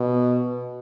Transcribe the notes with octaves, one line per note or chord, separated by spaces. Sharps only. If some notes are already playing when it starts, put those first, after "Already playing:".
Already playing: B2